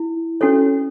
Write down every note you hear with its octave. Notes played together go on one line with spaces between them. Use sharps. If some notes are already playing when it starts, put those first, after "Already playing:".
Already playing: E4
C#4 F#4 A4 C#5